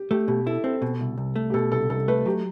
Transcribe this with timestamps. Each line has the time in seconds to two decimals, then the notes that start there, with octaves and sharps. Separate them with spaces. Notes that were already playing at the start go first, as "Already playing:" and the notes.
Already playing: G4
0.11 A3 G4
0.28 B2 G4
0.46 E4 A4
0.64 C4 A4
0.82 B2
1.01 C2
1.18 C2
1.36 A3
1.50 G4
1.54 B2 A4
1.72 C2 A4
1.90 C2 A4
2.08 A3 B4
2.26 F#3 G4